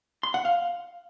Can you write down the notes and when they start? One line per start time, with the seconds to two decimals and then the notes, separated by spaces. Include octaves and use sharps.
0.23 C6
0.34 F#5
0.45 F5